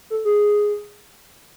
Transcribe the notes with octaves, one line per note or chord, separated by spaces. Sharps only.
A4
G#4